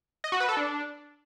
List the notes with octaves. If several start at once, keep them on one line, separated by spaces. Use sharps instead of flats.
D#5
F#4
B4
A4
D4